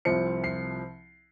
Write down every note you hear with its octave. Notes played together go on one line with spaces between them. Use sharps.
C2 C3 F3 C4 C#7
C7